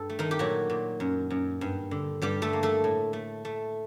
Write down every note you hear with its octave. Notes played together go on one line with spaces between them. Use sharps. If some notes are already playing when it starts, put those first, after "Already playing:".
Already playing: G2 A4
A3
D#3 D#4
G4
A#2 F#3 F#4
A#2
F#2
F#2
G2
D3
G2 G3 G4
A3 A4
A#3
A3 A4
A2
A3
A3